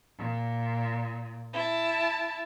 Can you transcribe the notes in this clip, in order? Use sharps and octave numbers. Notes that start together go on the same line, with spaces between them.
A#2
E4 A5